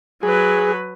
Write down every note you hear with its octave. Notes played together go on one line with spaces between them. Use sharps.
F#3 G#4 B4